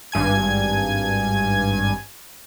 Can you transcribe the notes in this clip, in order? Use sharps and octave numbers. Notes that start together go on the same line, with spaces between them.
G#1 G2 G#5 G#6